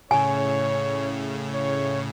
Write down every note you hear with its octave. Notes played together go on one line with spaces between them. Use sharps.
A2 C#3 C#5 G#5
C#5